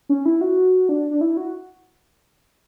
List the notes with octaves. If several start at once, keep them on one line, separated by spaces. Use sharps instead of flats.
C#4
E4
F#4
D4
D4
E4
F#4